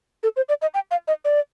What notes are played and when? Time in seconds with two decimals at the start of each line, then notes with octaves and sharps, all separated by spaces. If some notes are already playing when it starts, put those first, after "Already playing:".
0.23 A4
0.36 C5
0.49 D5
0.62 D#5
0.74 G5
0.91 F5
1.08 D#5
1.25 D5